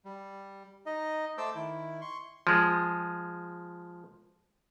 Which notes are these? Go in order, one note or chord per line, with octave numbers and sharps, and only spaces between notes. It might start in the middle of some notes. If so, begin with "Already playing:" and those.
G3
D#4 D#5
A3 C5 A5 D6 E6 G6
D#3 E4
C6 C#6
F3 G#3